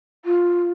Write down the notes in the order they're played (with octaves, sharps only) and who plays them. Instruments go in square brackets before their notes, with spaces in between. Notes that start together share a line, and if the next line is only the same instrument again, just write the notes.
[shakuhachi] F4